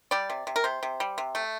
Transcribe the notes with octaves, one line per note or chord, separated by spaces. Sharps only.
G3 D5
C3
C3
A#4
C3 C5
C3
G3
C3
A3